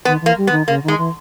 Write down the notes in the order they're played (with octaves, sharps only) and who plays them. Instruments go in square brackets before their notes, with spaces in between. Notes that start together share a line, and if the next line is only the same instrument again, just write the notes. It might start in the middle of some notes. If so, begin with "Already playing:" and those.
[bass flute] D#3 [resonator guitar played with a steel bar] B3
[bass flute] E3 [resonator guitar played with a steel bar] A#3
[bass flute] G3
[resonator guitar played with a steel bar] B3
[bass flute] D#3
[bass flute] C#3 [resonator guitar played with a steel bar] A#3
[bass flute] D#3 [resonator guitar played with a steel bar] G#3
[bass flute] E3